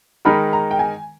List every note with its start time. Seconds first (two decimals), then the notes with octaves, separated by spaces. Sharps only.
0.25 D#3 G#3 D#4 A#4 B5
0.53 A#5
0.71 G5
0.79 G#5